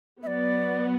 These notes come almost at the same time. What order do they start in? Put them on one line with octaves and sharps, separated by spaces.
F#3 B3 E5 D5